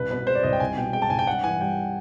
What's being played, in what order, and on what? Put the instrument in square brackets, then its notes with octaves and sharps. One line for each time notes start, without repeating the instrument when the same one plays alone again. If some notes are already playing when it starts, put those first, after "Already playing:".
Already playing: [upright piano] C2 [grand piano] B4
[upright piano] B2 [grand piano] B4
[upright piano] G#3 [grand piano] C5
[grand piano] D5
[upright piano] C2 [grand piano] D#5
[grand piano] G5
[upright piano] C2 [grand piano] G#5
[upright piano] B2 [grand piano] G5
[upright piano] G#3 [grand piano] G5
[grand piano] A5
[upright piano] C2 [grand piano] G#5
[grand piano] G5
[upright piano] G2 [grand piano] F#5
[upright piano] E3 [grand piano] G#5
[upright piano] G3 [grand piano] G5